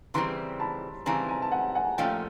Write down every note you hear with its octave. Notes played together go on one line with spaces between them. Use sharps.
C#3 E3 G3 C4 A#5 C6
A5 B5
C#3 E3 G3 C4 G#5 A#5
G#5 A#5
A5
F#5 G#5
F#5 G#5
A#2 F3 A3 C#4 F5 G5